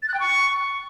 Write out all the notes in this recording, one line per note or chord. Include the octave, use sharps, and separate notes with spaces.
A6
F#6
G5
C#6